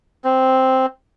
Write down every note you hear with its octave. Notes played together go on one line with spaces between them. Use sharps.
C4